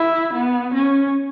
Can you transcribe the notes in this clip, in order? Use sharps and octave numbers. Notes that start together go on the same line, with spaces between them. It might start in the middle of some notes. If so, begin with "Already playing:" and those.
Already playing: E4
B3
C#4